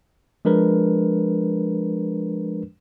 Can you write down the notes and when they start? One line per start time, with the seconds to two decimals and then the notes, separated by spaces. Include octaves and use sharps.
0.45 F3 G#3 D4 A#4 B4